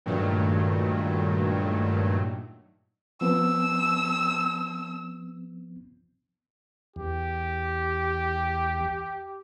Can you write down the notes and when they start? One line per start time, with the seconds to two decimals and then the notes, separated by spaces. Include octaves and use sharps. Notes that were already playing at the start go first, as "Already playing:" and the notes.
0.06 G2 A#2 D#3 F#3 A3
3.21 F3 B3 C4 E6
6.96 E2 G4